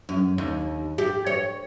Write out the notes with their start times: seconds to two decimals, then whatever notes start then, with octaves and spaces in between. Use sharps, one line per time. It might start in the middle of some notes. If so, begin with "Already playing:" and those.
0.09 F#2
0.38 D#2
0.98 G4
1.26 C#5